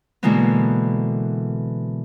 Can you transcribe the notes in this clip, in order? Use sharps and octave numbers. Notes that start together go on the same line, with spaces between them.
B2 D3 E3 G#3 A#3 B3